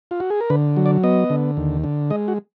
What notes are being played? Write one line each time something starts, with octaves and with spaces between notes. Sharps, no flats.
F4
F#4
G#4
A#4
D3 B4
F#3
D5
B3 D#5
D3
D#2
D3
G#3 D#5
F#4